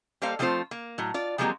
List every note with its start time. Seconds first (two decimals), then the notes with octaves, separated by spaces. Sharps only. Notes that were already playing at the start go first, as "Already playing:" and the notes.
0.22 G3 A#3 A4 C5 F5
0.39 F3 G3 A3 C4 F4 C5
0.71 A#3
0.98 A2 F#3
1.14 F4 D5
1.38 F3 F#3 G#3 A#3 C4 G4